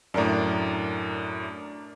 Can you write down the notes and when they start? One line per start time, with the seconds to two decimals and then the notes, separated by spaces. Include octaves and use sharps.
0.14 F#2 A2 D4 A#4 D5